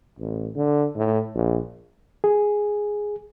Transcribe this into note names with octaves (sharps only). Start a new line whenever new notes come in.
A1
D3
A2
A#1
G#4